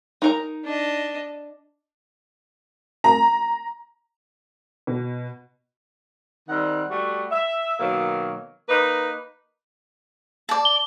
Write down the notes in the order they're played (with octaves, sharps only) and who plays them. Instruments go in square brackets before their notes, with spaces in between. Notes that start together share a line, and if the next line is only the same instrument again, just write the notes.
[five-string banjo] D#4 A#4 A#5
[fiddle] D4 D#5
[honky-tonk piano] A#5
B2
[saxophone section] D#3 G3 C4 F#5
G3 A3 F#4
E5
B2 D#3 F#3 A#3
A#3 D#4 B4
[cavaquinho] D5 A5
[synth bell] G7